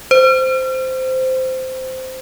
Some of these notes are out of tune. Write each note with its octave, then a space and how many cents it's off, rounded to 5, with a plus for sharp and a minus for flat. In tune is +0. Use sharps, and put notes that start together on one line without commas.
C5 -10